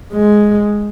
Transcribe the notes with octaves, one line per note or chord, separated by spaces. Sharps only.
G#3